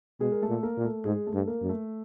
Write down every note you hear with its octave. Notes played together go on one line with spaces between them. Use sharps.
B2 G#3 G#4
A#4
A3 A4
A#2
A#3 A#4
A#2
A3 A4
G#2 G#3 G#4
A3 A4
G2
A#3 A#4
F#2
A3 A4